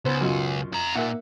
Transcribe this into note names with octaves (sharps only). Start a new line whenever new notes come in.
C#2 B3 C5
F#2 B2 F4
F2 A#5
A#2 A#3 E5 F#5